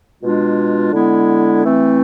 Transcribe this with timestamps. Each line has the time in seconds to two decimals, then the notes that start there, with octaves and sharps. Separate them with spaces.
0.21 B2 G#3 D4 F4
0.92 D3 G#3 B3 E4
1.63 E3 A3 C4